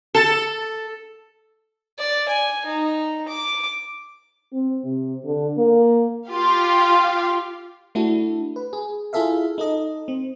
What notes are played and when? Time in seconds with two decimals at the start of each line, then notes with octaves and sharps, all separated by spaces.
0.15 A4
1.99 D5
2.28 G#5
2.65 D#4
3.28 D6
4.53 C4
4.84 C3
5.25 D3
5.57 A#3
6.29 F4 G4 F5
7.95 A3 D4 E4 F#4 A4
8.56 B4
8.73 G#4
9.13 E4 F4 G#4 A4 E5 F5
9.58 D#4 A4 D#5
10.08 C4